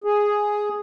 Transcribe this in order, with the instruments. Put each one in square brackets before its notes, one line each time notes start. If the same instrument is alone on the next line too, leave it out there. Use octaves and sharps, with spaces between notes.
[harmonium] G#4